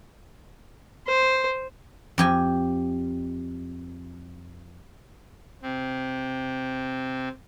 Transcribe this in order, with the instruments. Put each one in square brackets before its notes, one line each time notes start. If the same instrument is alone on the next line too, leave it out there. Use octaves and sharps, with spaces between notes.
[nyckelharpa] C5
[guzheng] F2 G4 G#5
[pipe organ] C3 C4